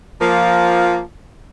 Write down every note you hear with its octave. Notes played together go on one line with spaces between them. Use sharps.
F3 A#3